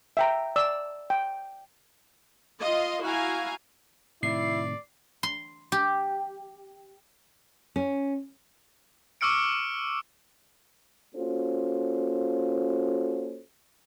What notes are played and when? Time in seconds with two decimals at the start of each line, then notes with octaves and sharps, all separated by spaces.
0.17 E5 G5 A#5
0.56 D5 E6
1.10 G5
2.61 F4 D#5 F5 C6
3.01 E4 F#4 F5 G#5 A#5
4.23 A2 C3 D#3 E4 D5 C7
5.23 C6
5.72 G4
7.76 C#4
9.21 C#6 D6 E6 F6 C#7 D7
11.15 A#3 C#4 F4 F#4 A4 C5